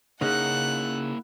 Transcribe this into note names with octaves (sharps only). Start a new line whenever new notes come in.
C#3 A#3 C#4 D#4 E4 F#5 F#6